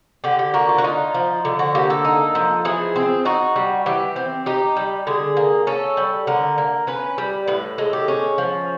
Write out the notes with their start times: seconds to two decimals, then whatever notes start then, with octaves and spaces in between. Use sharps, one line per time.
0.24 D3 G4
0.39 G4
0.54 A#3 F#4
0.69 F4
0.78 F#4
0.84 D#4 F4
1.14 F3
1.45 D3
1.59 F#4
1.75 A#3 G4
1.90 A4
2.05 D#4
2.35 F3
2.65 E3 G#4
2.96 C4
3.25 D#4 F#4
3.56 G3
3.86 E3 G4
4.16 C4
4.46 D#4 G4
4.76 G3
5.07 D3 G#4
5.37 A#3
5.67 C#4 A4
5.97 G3
6.27 D3 A#4
6.58 A#3
6.87 C#4 B4
7.18 G3
7.47 A2 B4
7.78 G#3 A4
7.93 G4
8.08 C#4
8.38 F3